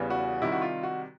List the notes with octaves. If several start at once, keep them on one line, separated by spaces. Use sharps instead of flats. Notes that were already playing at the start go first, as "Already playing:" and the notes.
Already playing: E2 C#3 E3 G3 B3
F#4
C3 D#3 G3 E4
F#4
F4
F#4